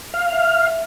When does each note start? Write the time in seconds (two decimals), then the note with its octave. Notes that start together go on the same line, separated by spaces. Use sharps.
0.14 F5
0.32 E5